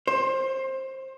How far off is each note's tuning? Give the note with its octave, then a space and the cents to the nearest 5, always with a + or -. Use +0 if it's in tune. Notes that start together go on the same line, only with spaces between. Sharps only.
C5 +20